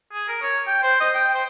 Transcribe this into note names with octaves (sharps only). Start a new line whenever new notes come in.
G#4
A#4
C#5
G5
C5
D#5
G5
C5